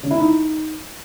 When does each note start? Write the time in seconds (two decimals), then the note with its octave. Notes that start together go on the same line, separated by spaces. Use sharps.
0.03 C#3
0.11 E4
0.18 D#4